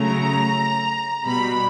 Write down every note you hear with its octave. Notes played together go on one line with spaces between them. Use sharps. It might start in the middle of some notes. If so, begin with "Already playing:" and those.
Already playing: C#3 F#3 A3 A#5
B2 G3 B5